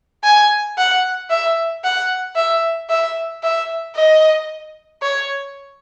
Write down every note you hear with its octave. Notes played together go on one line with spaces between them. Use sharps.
G#5
F#5
E5
F#5
E5
E5
E5
D#5
C#5